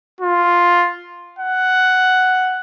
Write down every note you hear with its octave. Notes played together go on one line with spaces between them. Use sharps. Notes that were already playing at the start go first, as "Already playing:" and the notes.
F4
F#5